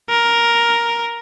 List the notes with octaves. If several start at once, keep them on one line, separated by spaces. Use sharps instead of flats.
A#4